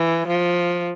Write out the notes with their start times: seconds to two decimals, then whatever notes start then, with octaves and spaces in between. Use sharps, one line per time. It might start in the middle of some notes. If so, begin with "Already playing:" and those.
Already playing: E3
0.28 F3